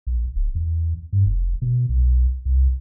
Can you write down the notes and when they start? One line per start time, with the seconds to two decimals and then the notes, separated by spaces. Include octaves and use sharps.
0.07 A#1
0.35 D1
0.55 E2
1.13 G2
1.26 F1
1.62 B2
1.89 B1
2.45 C2